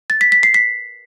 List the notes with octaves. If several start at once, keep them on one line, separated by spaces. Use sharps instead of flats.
A6
B6
B6
C7
B6